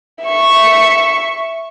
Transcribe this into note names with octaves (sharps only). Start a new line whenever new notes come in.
E5 C#6